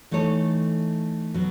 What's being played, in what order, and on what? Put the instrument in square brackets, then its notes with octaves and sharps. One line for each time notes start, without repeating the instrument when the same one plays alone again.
[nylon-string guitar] E3 A3 D#4 A4 C#5
B2 F#3